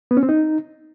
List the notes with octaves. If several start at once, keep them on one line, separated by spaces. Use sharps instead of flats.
B3
C#4
C4
D#4